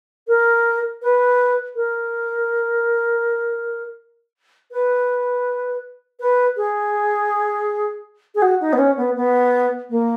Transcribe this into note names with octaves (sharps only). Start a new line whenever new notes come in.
A#4
B4
A#4
B4
B4
G#4
G#4
F#4
D#4
B3
C#4
B3
B3
A#3